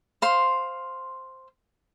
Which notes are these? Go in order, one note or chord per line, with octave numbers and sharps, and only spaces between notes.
C5 F5 C6